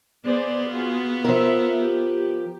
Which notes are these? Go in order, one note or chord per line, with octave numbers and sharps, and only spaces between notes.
B3 G#4 C5 D5
F4 F#4 G#4
F3 A#4 C5 E5
G4